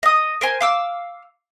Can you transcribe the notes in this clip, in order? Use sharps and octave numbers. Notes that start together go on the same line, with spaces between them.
D#5 D#6
A#4 C5 G#5
F5 D6 E6